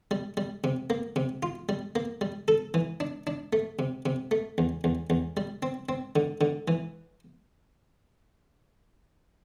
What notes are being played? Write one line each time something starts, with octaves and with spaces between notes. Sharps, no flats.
G3
G3
C3
A#3
C3
F4
G3
A#3
G3
A4
E3
D4
D4
A3
C3
C3
A3
E2
E2
E2
G3
C4
C4
D3
D3
E3